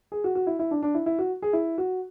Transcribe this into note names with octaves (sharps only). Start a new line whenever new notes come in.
G#4
F#4
F#4
E4
E4
D4
D4
E4
E4
F#4
G#4
E4
F#4